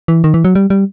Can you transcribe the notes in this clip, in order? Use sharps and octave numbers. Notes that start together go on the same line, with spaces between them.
E3
D#3
E3
F#3
G3
G3